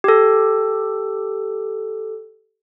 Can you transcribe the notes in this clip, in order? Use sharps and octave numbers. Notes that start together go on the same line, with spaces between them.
G4 A4